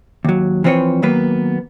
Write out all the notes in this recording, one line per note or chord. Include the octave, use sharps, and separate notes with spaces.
D#2 F#3
E3 F3 B3 C4 B4 C#5
D#3 F#3 A#3 B3 B4